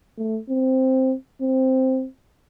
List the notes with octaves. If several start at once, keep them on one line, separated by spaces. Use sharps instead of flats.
A3
C4
C4